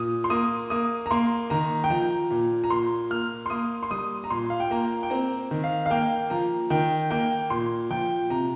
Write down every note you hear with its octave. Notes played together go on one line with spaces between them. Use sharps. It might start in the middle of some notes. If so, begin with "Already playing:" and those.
Already playing: A#2 D#6
C6
A#3 D#6
A#3 D#6
A#5
A#3 C6
D#3 A#5
G5
F3 A#5
A#2
A#5
A#2 C6
A#3 F6
C6
A#3 D#6
C6
G3 D#6
A#5
A#2 C6
F5
G5
A#3 A#5
G5
C4 A#5
D#3
F5
F5
A#3 G5
F3 A#5
D#3 G5
A#3 G5
A#2 C6
F3 G5
C3 A#5